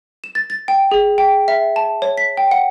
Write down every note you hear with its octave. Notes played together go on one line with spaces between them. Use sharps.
E7
A6
A6
G5
G#4
G5
E5
A5
C#5
B6
G5
F#5